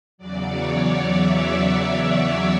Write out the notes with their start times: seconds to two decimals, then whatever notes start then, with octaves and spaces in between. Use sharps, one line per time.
0.18 E2 C#3 F#3 D5
0.49 C#5
0.81 D5
1.12 E5